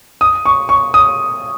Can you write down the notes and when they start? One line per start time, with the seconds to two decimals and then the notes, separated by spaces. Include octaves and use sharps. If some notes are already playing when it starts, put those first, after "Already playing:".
0.21 D#6
0.46 C#6
0.69 C#6
0.94 D#6